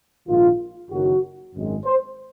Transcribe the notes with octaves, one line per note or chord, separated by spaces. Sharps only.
A#1 G#2 D#3 F4
F#1 F#2 D#3 F#3 F#4
G#1 F#2 D#3 G#3
C5